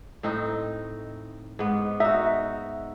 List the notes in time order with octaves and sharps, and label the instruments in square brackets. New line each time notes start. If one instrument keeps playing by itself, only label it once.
[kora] A2 C4 D#4
G#2 B3
[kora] D#4 F#4 [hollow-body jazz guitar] E5